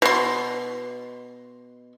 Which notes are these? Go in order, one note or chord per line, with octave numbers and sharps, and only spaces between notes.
B2 C6